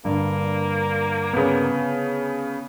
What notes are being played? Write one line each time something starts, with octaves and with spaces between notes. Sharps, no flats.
G2 D3 A#3
C#3 B3